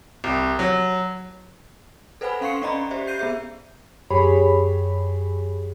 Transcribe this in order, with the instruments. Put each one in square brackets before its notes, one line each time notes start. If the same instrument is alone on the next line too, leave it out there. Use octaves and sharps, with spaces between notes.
[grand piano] C2
F#3
[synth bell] A4 B4 C5 F#5 G#5 B5
C#4 F5 C6 C#6 C7 C#7
C#4 D5 D#5 A#5 B5
G4 C5 D5 E5
G6 C7 D#7
B3 G#4 E5
[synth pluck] F#2 G4 G#4 C#5 B5